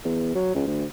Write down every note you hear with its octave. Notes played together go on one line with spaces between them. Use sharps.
E2
F#3
C#2
D2